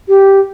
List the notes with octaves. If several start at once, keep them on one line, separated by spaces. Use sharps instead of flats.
G4